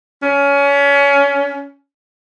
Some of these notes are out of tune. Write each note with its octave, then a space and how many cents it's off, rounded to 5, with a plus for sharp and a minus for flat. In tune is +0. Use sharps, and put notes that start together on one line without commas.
C#4 +25